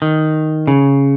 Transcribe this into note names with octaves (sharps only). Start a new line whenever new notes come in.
D#3
C#3